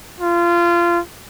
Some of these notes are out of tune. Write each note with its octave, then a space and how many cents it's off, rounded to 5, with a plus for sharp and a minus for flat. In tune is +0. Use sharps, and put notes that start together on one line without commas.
F4 -25